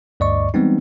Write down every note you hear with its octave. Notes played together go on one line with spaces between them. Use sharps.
D2 G2 D5 D#5 C#6
E3 G3 G#3 B3 C4 D#4